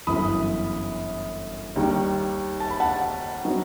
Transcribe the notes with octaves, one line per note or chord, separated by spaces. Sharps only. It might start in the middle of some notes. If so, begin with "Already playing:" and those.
G1 F#2 E3 B5 D#6
D#2 D#3 G3 D#4
A5
B5
F#5 A5
F#3 B3 D#4